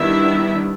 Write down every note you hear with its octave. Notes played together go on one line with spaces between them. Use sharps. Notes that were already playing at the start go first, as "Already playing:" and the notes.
Already playing: D#3 G3 B3 D4 E4 E5